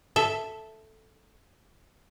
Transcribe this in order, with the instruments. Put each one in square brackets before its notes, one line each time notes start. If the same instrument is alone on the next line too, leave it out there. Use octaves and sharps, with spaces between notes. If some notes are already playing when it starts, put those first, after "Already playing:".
[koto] A4 E5